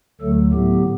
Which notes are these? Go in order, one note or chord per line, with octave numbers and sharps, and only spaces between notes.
D2 D3 F#3 A3 A4
A2 F#3 B3 G4